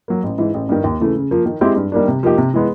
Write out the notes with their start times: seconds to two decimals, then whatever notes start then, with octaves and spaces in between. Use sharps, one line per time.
0.08 F#3 A#3
0.23 A1
0.38 G#2 E3
0.54 A1
0.69 G2 D#3
0.84 D#2
1.00 C#3 E3 A3
1.16 C#3
1.31 F3 A#3
1.46 D#3
1.61 G#3 C4 E4 G4
1.76 G2
1.92 D#3 G3 A#3 D4
2.08 C3
2.23 F3 A#3 D#4 G4
2.38 C3
2.54 E3 G#3 B3